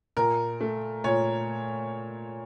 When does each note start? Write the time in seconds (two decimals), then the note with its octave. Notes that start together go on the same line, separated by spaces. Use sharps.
0.17 A#2 A#4
0.61 A3
1.04 A#2 C#5